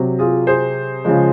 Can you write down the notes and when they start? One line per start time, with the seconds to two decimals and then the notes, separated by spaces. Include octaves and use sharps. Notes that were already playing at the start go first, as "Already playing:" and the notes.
Already playing: C3 F#3
0.19 F4 G#4
0.47 G#4 C5
1.05 C#3 F3 G#3